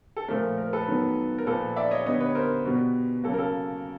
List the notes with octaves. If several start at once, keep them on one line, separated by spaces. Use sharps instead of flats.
A4
A#2 F3 A3 A#4
A#4
A4 B4
D#3 F#3 B3
A#4
A#2 F3 A#3 A4 B4
D5 E5
C#5 D#5
D3 G3 B3 C#5 D#5
B4 C#5
A#4 C5
B2 G3 B3
C#3 F#3 A#3 A4
A#4
A4